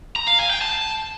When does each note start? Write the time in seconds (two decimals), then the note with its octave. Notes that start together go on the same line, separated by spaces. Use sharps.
0.16 A#5
0.27 F5
0.39 G#5
0.50 G5
0.61 A5